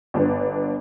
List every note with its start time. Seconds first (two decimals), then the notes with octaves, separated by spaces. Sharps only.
0.14 G1 D4 B4